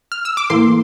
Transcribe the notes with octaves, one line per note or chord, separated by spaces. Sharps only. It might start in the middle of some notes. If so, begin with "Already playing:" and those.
F6
E6
D6
A2 E3 A#3 C6